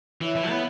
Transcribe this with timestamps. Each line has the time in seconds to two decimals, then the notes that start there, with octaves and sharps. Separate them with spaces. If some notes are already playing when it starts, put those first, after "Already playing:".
0.21 E3 E4 C#5 E5
0.36 E3
0.49 B3 E4 C#5 E5